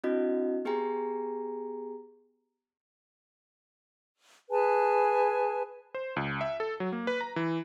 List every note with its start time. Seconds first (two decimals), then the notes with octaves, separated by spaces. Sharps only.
0.04 C4 D4 E4 F#4 D#5
0.65 B3 G4 G#4 G5 G#5 A#5
4.50 G#4 B4 G#5 A5
5.94 C5
6.16 C#2
6.41 E5
6.60 A4
6.80 F#3
6.92 A#3
7.07 B4
7.21 A#5
7.36 E3